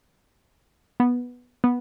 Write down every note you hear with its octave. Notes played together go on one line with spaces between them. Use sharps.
B3
B3